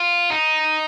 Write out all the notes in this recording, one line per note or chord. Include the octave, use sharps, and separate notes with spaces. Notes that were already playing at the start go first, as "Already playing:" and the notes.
Already playing: F4
D#4